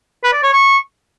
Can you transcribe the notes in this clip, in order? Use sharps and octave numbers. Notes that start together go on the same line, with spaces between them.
B4
D5
C#5
C#6